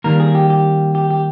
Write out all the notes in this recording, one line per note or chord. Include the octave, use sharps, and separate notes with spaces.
D#3 G3 A#3 A#4
G#4
G4
G4
G4
G4